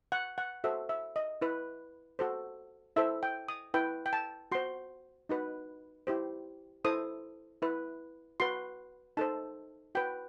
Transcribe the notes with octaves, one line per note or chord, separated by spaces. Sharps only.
F#5
F#5
F#4 A4 C5 E5
E5
D#5
E4 B4
F#4 A4 C5
E4 A4 C5 E5
G5
D#6
E4 B4 G5
G5
A5
F#4 C5 C6
D#4 F#4 B4
E4 G4 C5
E4 A4 C5 D#6
E4 B4
F#4 B4 C6
D#4 A4 C5 A5
F#4 B4 G5